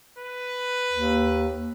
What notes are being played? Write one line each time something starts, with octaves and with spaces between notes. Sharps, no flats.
B4
D#2